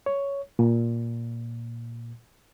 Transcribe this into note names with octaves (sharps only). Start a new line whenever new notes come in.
C#5
A#2